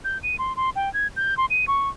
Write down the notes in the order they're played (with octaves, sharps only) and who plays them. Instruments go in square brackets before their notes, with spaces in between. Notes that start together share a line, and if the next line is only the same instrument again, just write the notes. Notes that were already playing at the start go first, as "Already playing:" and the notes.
[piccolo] G6
D#7
C6
C6
G5
G#6
G6
C6
D#7
C#6